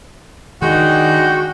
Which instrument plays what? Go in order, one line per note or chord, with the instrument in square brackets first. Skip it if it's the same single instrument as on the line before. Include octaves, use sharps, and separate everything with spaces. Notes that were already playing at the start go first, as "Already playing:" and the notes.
[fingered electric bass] D#3 [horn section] G#3 D4 D#4 [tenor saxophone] F#4 [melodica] G5